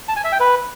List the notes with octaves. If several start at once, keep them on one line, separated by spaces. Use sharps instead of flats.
A5
G#5
E5
G5
B4